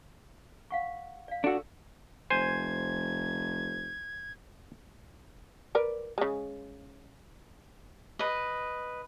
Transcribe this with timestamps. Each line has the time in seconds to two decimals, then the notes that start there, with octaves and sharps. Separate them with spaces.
0.71 F5 F#5 C#6
1.28 D5 F5
1.44 D4 F#4 A4 E6
2.30 F1 C5 G#5 G#6
5.75 A#4 B4 D5
6.18 C#3 G#3
8.19 B4 D#5